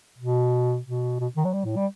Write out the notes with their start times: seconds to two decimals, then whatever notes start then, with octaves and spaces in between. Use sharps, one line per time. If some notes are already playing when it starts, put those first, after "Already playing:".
0.18 B2
0.86 B2
1.20 B2
1.36 D#3
1.45 F#3
1.53 G3
1.65 A2
1.76 G3